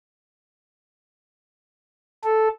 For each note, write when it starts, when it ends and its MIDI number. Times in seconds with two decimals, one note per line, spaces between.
2.25 2.48 69